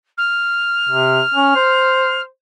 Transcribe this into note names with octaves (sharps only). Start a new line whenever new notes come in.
F6
C3
C#4
C5